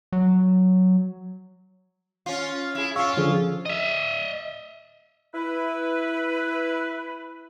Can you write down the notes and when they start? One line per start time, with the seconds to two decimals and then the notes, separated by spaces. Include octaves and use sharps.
0.12 F#3
2.26 C#4 F4
2.75 E4 G#4
2.96 C#4 F4 F5 C#6 E6
3.17 D3 F3 G#4
3.66 D#5 E5
5.34 E4 B4